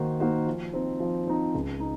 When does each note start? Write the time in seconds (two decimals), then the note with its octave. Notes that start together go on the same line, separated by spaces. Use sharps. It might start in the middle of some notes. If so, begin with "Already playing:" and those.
Already playing: D#3 A#3 D#4 F#4 C5
0.20 A#3 D#4 F#4 C5
0.47 F3
0.74 C4 D#4
1.00 F3
1.27 C4 D#4
1.55 C#2
1.80 D#4